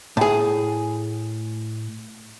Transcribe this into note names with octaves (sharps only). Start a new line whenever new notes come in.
A2 G#4